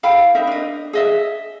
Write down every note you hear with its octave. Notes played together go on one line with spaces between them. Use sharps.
E4 F5 G5 B5
D#4 A#4 E5
D4 D#5
G#4 D#5 E5